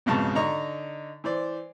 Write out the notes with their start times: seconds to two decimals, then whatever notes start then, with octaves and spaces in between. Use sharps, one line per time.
0.06 B1 F2 G#2 C#3 B3 A5
0.35 D3 D#4 A#5 C#6
1.24 E3 C5 D5